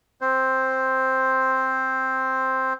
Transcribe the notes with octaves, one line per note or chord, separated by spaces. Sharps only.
C4 C5